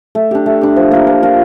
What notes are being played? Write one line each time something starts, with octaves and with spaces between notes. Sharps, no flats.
A3
D4 G4
A3
D4 G4
F3
A#3 F4 A#4
F3
A#3 F4 A#4